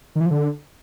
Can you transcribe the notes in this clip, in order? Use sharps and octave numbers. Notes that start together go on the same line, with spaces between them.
D#3
E3
F3
D3